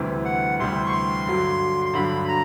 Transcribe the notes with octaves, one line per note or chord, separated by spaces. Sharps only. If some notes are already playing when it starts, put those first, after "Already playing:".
Already playing: D2 C3 E3 G3
F#5
D2 C3 E3 G3 C6
C#6
C6
G2 D3 F#3
C6
G2 D3 F#3 B5
A#5